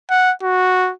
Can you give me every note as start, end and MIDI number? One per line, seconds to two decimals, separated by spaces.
0.10 0.33 78
0.43 0.92 66